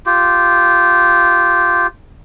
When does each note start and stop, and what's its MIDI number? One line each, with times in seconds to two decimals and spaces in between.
0.06 1.87 65
0.06 1.87 67